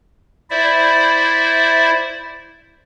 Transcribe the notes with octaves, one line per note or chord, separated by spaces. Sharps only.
E4 C5 D5 E5